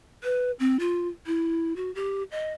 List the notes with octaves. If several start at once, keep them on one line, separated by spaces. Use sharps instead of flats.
B4
C4
F4
E4
F#4
G4
D#5